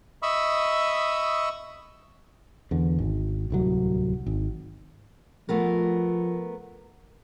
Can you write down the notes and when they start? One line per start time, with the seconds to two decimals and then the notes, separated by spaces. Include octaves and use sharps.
0.23 D#5 E5 B5 C#6 D#6 E6
2.71 E2 D3
2.99 G#1
3.50 D1 C2 F#3
4.26 G#1
5.49 F3 A3 B3 A#4